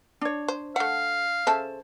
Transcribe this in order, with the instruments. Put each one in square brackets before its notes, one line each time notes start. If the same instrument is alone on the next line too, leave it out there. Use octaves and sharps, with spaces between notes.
[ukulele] D4 C#5
[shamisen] C5
[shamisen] A3 F#5 [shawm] F5
[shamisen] C#3 A4 E5 [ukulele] C5 A5